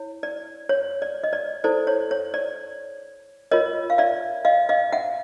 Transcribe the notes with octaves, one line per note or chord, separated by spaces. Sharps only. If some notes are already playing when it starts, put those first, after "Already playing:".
Already playing: E4 C#5
D5
C#5
D5
D#5
D5
E4 A4 C5 D5
C#5
C#5
D5
F4 A#4 C#5 D#5
F5
D5 E5
D#5 F5
D#5 F5
E5 F#5